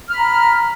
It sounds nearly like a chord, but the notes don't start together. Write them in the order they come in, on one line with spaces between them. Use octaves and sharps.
F6 B5 A#5